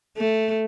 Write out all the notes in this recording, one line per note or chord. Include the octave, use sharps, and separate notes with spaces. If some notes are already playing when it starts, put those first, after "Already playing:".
A3